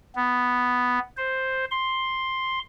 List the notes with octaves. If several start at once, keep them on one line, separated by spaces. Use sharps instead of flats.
B3
C5
C6